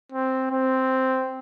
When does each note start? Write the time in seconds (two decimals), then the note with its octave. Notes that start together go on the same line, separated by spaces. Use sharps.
0.12 C4
0.51 C4